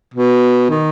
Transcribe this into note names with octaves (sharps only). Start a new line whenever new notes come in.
B2
D#3